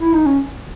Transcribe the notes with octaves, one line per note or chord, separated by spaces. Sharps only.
E4
D#4
C#4